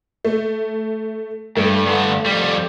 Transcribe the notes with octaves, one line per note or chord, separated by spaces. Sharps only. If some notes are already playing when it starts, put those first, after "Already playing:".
A3
G2 A3
G2 D3
F2 G3